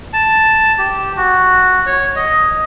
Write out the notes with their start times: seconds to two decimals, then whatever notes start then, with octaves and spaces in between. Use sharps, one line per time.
0.13 A5
0.78 G4
1.17 F#4
1.86 C#5
2.16 D#5